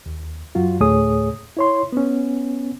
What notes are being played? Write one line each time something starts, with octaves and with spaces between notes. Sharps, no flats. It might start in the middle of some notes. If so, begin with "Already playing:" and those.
D#2
F#2 F#3 F4 F#4
D2 A2 A3 G#4 C#5 D#6
E4 C#5 C6
B3 C#4